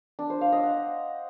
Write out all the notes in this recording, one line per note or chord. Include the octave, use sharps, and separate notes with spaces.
D4
C5
F5
D#5
F#5